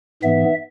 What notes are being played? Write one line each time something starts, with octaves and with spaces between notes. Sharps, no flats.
G#2 E3 B3 E5